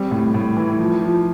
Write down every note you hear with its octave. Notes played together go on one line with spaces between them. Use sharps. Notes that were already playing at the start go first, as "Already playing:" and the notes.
Already playing: G3 C4
A2
A2
E3
F3
F3